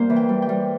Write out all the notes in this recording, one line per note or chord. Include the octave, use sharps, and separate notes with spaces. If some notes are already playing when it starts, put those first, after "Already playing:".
Already playing: G2 G3 A#3 C5
E3
G5
G3
G5
G3